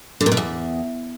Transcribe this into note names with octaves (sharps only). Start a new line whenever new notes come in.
D3
A#2
B2
E2